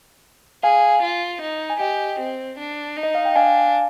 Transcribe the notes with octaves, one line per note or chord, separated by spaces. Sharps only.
G#4 F5 G#5
F4
D#4
G#5
G4 D#5 G5
C4
D4
D#4
D#5
F5
G5
D4 F5 G#5